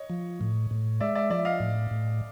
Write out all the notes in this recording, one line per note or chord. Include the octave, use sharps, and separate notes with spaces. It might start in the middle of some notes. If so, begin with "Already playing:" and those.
Already playing: C#5 D#5
F3
A2
A2
G#3 D5 E5
D5 E5
F3 D5 E5
D#5 F5
A2
A2